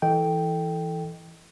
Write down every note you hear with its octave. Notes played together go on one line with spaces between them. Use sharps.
E3 A4 D#5 G5